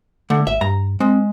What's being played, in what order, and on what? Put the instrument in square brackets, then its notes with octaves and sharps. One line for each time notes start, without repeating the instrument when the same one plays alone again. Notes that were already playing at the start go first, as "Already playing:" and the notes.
[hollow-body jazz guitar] D3 [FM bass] A3
[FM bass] G#1 [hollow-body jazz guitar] E5
[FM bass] G2 [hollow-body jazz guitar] A#5
[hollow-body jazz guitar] G#3 [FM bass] C4